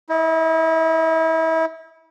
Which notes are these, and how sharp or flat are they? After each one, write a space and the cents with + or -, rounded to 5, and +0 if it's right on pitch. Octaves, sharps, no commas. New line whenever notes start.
E4 -30 D#5 +5